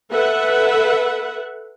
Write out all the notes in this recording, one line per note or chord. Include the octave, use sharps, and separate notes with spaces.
A4 B4 E5 F#5